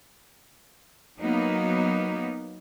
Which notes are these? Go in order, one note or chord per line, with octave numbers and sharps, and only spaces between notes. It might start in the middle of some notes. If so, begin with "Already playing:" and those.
F#3 A#3 B3 D#4